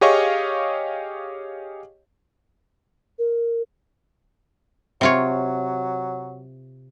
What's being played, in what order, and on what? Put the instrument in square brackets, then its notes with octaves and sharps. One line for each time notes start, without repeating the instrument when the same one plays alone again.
[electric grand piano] G4 G#4 C#5 D#5 F5 C#6
[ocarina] A#4
[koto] C3 F4 C#5 [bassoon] F#3